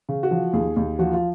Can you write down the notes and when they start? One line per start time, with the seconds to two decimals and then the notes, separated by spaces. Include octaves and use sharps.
0.09 C#3
0.23 F#4
0.31 F3
0.53 D#2 G#4
0.76 D#2
0.99 F3 F#4
1.13 F4